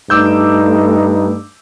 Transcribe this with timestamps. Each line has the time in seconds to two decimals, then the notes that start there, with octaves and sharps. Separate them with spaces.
0.10 G2 A3 D#4 D6 E6 G6